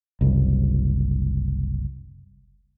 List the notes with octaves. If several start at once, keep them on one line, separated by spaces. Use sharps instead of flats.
F#1 C2